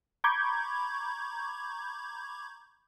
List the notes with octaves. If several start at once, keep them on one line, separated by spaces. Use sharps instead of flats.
A#5 B5 C#6 D6 G6 G#6